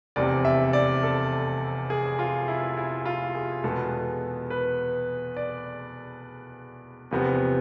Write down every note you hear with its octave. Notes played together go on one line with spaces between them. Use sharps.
F1 E2 C3 D5
E5
D5
A4
G#4
F4
E4
E4
F4
G#4
E2 B2 G#3 B3 A4
B4
D5
E2 C3 F3 B3